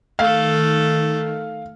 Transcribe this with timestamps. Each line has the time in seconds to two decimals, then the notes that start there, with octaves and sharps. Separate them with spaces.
0.19 D#3 A3 A4 F5